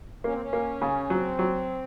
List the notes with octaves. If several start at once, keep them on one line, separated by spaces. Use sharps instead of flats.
A#3 C#4
C4
C#4
A#3
C#3
F#3 C4
F#3